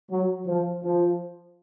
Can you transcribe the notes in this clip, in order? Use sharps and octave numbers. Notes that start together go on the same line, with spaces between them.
F#3
F3
F3